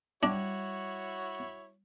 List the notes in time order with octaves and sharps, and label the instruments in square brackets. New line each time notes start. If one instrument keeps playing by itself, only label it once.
[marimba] G3 [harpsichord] D4 [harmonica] E4 F#4 C#5